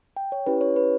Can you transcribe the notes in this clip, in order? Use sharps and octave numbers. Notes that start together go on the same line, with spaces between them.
G5
C#5
C#4 E4 G4 B4
C#5
B4